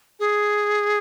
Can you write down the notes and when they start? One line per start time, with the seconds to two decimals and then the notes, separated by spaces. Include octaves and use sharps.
0.20 G#4